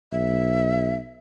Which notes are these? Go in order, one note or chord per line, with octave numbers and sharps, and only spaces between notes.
B1 E5